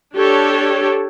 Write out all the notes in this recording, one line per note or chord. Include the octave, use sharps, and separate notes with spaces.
D4 G4 A4 C#5